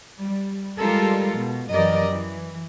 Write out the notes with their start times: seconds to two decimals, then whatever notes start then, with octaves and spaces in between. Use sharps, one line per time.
0.21 G3
0.79 G3 G#3 F4 G4 A4 A#4
1.36 B2
1.72 F#2 E3 G4 A#4 D5 D#5
2.09 E3